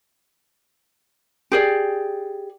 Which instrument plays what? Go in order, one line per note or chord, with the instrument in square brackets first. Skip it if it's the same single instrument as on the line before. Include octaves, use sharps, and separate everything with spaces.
[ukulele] G4 G#4 D5